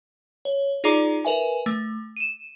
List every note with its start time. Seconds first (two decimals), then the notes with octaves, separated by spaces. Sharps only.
0.45 C#5
0.84 D#4 F4 G#4 D5 A#5 D6
1.25 A#4 B4 E5 G#5
1.66 A3
2.17 D#7 E7